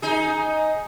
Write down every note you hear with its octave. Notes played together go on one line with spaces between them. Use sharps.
D#4 G#4